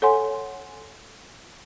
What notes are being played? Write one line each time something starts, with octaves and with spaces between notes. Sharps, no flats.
A4 C#5 F#5 G#5 C6